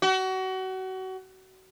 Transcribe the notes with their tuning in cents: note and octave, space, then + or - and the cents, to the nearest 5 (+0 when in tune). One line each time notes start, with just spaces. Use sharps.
F#4 +30